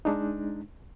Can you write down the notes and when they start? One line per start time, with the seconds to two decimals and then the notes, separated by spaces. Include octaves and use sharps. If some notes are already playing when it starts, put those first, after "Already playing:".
0.05 G#3 D4 D#4